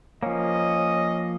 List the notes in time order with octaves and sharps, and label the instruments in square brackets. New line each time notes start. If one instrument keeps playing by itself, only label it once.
[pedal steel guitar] F3 A#3 [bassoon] C#4 [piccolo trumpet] D#5